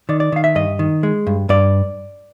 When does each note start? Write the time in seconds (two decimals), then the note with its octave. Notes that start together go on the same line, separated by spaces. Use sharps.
0.09 D#3 D5
0.20 D5
0.32 D#3 F5
0.44 E5
0.55 G2 D#5
0.79 D#3
1.03 G#3
1.27 G2
1.49 G2 D5